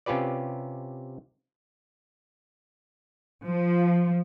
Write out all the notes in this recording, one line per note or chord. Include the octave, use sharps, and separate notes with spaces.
C3 C#4 F4 G4 B4 D5
F3